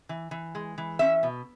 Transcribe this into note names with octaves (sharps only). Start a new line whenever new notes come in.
E3
E3
G#3
E3
C#4 E5
B2